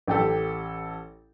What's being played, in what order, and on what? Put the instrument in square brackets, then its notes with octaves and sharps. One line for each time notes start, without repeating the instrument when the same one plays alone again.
[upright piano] A1 G4 A4